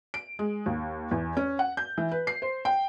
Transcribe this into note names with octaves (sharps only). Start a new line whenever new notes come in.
D7
G#3
D#2
E2
C#4
F#5
G6
E3
B4
C7
C5
G5